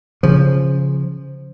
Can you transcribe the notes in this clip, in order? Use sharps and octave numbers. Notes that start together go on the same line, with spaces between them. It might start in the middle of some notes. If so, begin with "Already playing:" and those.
C#3 F3